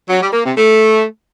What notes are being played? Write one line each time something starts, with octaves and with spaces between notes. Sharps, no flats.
F#3
G3
A#3
C3
A3